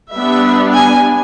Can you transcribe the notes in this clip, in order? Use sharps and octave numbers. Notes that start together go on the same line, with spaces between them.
G3 B3 D4 E5
G#5